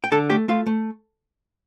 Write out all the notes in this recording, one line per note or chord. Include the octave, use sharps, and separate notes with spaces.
G5
D3 A4 A5
A3 G4 G5
A3 F4 F5
A3